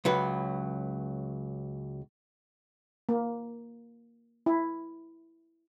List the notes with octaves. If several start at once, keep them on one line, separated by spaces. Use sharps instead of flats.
C#2 F#3 B4
A#3
E4